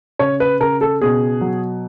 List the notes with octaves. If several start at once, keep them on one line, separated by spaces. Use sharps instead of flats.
C#3 C#5
B4
C#3 A#4
A4
B2 G#4
F#3